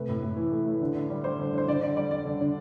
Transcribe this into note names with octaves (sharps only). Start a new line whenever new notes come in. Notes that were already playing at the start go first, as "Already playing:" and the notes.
Already playing: C3 A3 B4
A2
A2
E3
A3
A2
D3
D3
G3
G3 C5
D3
D3 C5
D3 D5
D3 D5
G3 D5
G3 D5
D3
D3